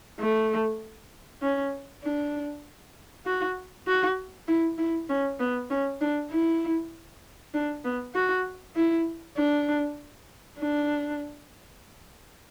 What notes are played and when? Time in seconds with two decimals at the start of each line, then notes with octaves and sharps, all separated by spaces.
0.20 A3
1.42 C#4
2.03 D4
3.25 F#4
3.87 F#4
4.47 E4
4.78 E4
5.09 C#4
5.40 B3
5.70 C#4
6.01 D4
6.31 E4
7.54 D4
7.84 B3
8.15 F#4
8.76 E4
9.37 D4
10.59 D4